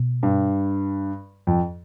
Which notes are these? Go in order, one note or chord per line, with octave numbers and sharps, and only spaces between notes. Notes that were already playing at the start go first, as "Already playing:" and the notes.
Already playing: B2
G2
F2